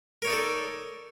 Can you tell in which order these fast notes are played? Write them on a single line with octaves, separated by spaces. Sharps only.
A#4 C#5 D#4 D5 A4